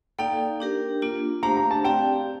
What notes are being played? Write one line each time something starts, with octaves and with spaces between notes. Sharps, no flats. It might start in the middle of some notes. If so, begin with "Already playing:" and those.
A#3 D#4 A4 D5 F5 G5
D4 G4 A#4
A#3 D4 F4
A3 D4 G4 C5 F5 A#5
A#5
A5
C4 G4 D5 F5 G5